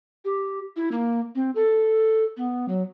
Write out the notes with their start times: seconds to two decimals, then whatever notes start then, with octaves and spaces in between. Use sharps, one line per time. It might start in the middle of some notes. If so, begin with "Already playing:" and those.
0.25 G4
0.76 E4
0.92 A#3
1.35 C4
1.55 A4
2.37 B3
2.68 F#3